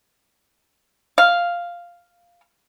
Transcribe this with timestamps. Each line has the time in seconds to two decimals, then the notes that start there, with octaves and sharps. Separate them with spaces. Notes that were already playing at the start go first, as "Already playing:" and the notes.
1.18 F5